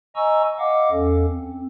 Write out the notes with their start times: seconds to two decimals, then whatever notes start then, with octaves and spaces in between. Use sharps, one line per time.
0.16 D#5 G#5 A#5 C#6 E6
0.59 D#5 F5 F#5 D6
0.91 E2 C#4 A4
1.28 C4